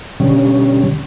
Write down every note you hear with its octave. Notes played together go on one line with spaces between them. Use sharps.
B2 D3 G3 C#4